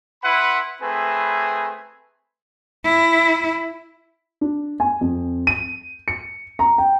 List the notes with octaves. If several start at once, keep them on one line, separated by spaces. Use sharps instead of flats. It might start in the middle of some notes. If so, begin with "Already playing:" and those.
E4 B4 F#5 B5 C6
A3 C4 G#4 B4
E4
D4
G#5
F2
D#7
C#7
A#5
G5